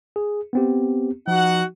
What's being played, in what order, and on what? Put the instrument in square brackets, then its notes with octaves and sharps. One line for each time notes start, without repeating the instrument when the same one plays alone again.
[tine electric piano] G#4
B3 C4 G4
[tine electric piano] F3 [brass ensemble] D#4 F#4 F#5